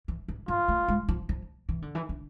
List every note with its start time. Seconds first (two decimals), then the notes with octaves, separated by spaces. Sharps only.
0.08 E3
0.28 E3
0.48 F3 F4
0.68 A3
0.88 G#3
1.08 F3
1.29 F3
1.69 E3
1.82 D3
1.95 E3
2.09 D3